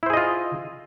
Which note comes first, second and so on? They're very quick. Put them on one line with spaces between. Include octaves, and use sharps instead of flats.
E4 C5 G#4 D#5 F4